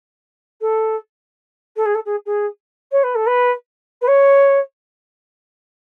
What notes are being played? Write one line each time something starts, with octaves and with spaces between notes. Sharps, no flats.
A4
A4
G#4
A4
G#4
G#4
C#5
B4
A4
B4
B4
C#5